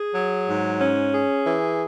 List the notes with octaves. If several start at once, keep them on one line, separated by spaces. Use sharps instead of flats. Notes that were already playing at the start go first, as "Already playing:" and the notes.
Already playing: G#4
F#3
G#2
C#4
G#4
E3